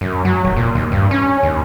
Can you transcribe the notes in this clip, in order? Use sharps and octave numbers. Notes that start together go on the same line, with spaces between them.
F#2
F#3
D#1
A#2
D#2
G2
C#4
D#2